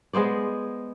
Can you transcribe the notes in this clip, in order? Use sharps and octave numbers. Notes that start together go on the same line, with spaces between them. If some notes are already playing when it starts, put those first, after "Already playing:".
G#3 B3 C5 D5